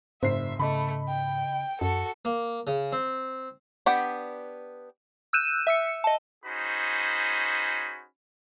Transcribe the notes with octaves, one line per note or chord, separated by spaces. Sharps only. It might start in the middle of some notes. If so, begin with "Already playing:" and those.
F#1 G#2 C5 E5 C7
C#3 A3 D#5 B5
G5
F#2 F#4 A4
A#3
C#3
C4
B3 D4 G4 F#5
E6 F#6 G6 D#7 E7
E5 E6 C#7
D#5 A5
C#4 D#4 F#4 G#4 C5 B5